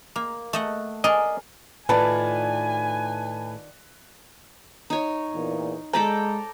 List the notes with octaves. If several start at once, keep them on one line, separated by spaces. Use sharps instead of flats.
A#3
A3 D#5 F#5
G#4 A#4 D5 D#5
A2 D#3 F4 B4 D5 G#5 A5
D#4 C#5
E2 A#2
G#3 A4 D5 G5 A#5